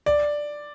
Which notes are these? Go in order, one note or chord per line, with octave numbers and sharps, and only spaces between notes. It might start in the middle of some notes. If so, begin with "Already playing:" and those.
D5